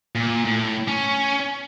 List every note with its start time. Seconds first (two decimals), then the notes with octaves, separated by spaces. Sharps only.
0.15 A#2
0.45 A2
0.88 C#4